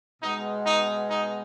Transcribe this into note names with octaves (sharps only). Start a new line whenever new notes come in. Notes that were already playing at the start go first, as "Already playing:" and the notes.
B2 G#3 B3 D#4
D#4
D#4